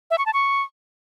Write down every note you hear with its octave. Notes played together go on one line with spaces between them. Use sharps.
E5
C#6
A5
C#6